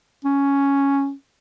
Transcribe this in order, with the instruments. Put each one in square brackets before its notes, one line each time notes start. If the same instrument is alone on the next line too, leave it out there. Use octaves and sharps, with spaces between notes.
[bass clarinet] C#4